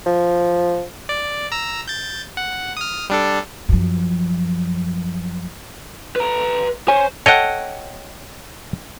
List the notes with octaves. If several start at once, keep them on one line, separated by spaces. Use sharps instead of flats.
F3
D5
A#5 E6
G6 A6
F#5
D#6 F6
G3 D4 A4
F#2 F3
B4 A#5
C5 C#5 G#5
A4 C#5 D#5 F#5 G5